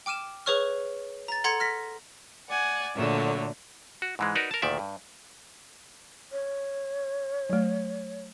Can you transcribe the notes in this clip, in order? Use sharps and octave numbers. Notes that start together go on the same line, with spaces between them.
G5 D6 F6 D#7 E7
G#4 B4 C#5 C#6 F6
A#5 A6
A4 F#5 A#5 C6 G#6 C#7
F6 A#6 B6
D5 F#5 G#5
A#2 D3 F#3 A3
F#4
G#2 E3 G#3
D#4 F#4 A#4 B4 D5
A#4 A5
D2 A#2 D#3 D5 E5
G2
C#5
F#3 A3